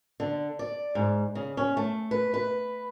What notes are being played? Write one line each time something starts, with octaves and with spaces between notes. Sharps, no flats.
D3
D5
G#2
C#3
C#4
A3
B4
B4